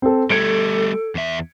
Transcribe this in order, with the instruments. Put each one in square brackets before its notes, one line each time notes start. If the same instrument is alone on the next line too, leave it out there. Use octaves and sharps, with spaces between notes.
[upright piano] C4 A4
[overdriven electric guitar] G3 A3 [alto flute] A4 [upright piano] G#6 C#7 D7
[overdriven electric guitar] E2 E5